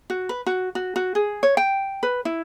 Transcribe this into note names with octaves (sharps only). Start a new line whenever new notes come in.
F#4
B4
F#4
F#4
F#4
G#4
C#5
G5
B4
E4